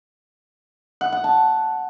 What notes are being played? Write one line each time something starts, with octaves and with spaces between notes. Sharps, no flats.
F#5
F#5
A5